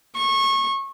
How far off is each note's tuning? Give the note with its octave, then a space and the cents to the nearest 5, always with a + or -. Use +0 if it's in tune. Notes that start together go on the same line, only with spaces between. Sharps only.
C#6 -25